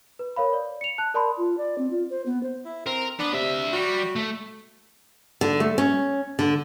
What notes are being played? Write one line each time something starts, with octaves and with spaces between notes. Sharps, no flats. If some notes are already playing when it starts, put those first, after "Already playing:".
B4
A#4 C#5 F5 B5
D5
C#7 F7
A5 F#6
A#4 D5 A5 B5 C6
F4
D5
C4
F4
C5
B3
C5
E4
C4 A#4
B3 D4
C3 D4 E5
G3 F#4
A3
D3
A3
C#4
D3